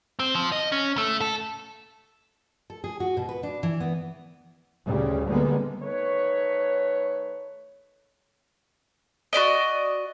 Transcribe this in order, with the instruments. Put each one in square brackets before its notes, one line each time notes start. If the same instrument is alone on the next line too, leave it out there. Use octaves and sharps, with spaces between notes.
[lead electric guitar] C4
F3
D#5
C#4
A3
A4
[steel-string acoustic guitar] A4
G#4
F#4
B2
B4
D4
E3
B3
[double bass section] D2 C#3 G3
D3 G3 G#3 A#3 B3
[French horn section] D#3 A3 B4 C#5
[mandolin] F#4 G4 D5 D#5